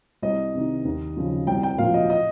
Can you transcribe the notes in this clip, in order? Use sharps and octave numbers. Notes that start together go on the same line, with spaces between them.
C2 D#5
C3 D#3
D#2
C#3 F3
C2 G5
G5
A#2 F3 F5
D#5
D#5